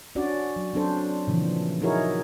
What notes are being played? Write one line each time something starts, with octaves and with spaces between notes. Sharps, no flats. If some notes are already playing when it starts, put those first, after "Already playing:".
C#4 D4 F#4 D5
F#3
F#3 C4 D4 A4 C5
A#2 C#3 E3 F3
D#4 E4 F#4 G#4 A#4 C#5